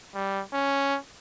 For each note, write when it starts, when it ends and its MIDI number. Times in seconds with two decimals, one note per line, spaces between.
0.15 0.42 55
0.53 0.97 61